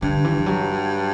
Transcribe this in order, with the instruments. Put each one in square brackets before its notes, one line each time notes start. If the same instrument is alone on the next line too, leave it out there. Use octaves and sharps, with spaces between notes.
[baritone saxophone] G2 [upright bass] D3
[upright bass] E3
E3
F#3